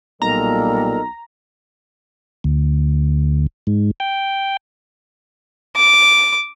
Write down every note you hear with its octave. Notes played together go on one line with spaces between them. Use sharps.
B1 A#2 G3 A4 A#4 D#5 A#5
D2
G#2
G5
D6